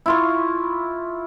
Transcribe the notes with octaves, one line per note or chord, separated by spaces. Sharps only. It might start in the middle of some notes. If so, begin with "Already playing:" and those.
E4 F4 C#6